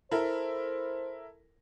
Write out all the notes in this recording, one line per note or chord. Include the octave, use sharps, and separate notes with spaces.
E4 A4 A#4 C5